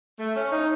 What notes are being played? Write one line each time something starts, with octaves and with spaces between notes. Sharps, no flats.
A3
C#4
D#4